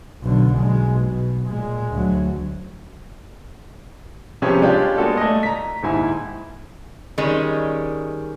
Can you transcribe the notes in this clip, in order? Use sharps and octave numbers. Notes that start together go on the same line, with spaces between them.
B1 D3
B1 G#3
B2
A#2 G#3
D2 F#3
C3 F3 B3 C#4 G4 G#4
G#3 D4 F4 G4 C#5
G#3 A#3 B3 F#4 A4
A3 D5 D#5
A#5 B6
D#1 G#2 E4 G#5
D#3 G3 G#3 C#4